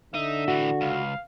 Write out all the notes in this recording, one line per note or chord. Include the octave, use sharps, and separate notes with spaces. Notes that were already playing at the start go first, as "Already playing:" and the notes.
D3 D#4 E5
A2 E3 F#4
C#2 F5